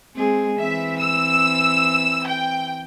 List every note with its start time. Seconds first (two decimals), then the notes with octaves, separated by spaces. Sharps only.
0.15 G#3 C4 G#4
0.59 E3 C4 E5
0.99 E6
2.27 G5